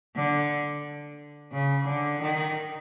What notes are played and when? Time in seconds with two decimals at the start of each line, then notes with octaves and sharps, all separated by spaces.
0.16 D3
1.52 C#3
1.87 D3
2.21 D#3